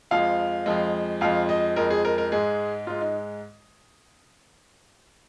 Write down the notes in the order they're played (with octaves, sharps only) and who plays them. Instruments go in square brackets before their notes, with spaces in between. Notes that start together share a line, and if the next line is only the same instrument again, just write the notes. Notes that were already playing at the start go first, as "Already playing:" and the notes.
[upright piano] F2 F3 G#3 F5
F2 F3 G#3
F2 F3 G#3 F5
D#5
F2 F3 G#3 A#4
G#4
A#4
A#4
G#2 G#3 G#4
G#2 G#3 F4
D#4